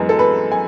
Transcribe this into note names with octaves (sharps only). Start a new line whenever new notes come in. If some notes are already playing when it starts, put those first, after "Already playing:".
Already playing: F#2 E3 G#3 B3
A4
B4
G#5